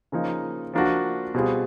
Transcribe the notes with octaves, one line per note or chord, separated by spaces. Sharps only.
C#3 F3 A#3 D#4
F3 A#3 D4 F#4
B2 G3 C4 F4 G#4